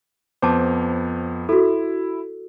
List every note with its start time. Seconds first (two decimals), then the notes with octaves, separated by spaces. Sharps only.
0.42 F2 B3 C5 A5 D6
1.49 E4 F#4 A4